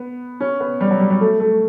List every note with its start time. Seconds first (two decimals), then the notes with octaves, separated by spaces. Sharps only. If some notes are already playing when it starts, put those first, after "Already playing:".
Already playing: B3
0.40 C#4
0.60 B3
0.81 G3
0.91 F#3
1.00 G3
1.10 G3
1.21 A3
1.40 A3